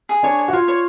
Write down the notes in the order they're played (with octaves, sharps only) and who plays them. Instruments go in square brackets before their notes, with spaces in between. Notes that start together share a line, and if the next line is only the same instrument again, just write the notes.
[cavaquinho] G#4
[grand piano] D4 [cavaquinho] C#5
[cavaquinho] C#5
[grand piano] F#4
[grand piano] F4 [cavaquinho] C#5
[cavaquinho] C#5